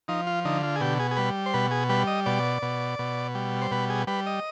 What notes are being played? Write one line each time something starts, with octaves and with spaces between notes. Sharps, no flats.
F3 D#4
F4
D3 D#4
F4
G#4
B2 G4
G#4
G#4
G3 B4
C5
B2 B4
G#4
G3 B4
D#5
B2 D5
B2
B2
G3
C5
B2 B4
G#4
G3 B4
D#5